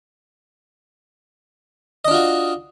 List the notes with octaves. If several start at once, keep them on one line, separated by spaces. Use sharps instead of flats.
D4 F4 F#4 D#5